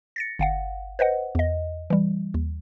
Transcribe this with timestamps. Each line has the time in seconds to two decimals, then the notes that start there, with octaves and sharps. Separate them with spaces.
0.16 A6 A#6 C#7
0.39 G1 F5 F#5
0.99 B4 C5 D#5 F#5
1.35 E2 D#5
1.90 E3 G3
2.34 D#2